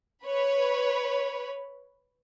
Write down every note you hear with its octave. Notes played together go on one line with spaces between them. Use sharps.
B4 C#5 B5